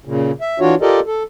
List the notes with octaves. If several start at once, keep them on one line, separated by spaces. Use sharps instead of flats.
A#2 C#3
E5
E3 D4 F4 F#4 C#5
F4 G4 A4 A#4 D5 D#5
A4